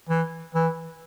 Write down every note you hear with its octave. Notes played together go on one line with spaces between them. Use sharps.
E3
E3